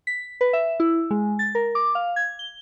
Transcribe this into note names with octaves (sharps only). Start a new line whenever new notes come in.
B6
B4
E5
E4
G#3
A6
A#4
D6
F5
G#6
G7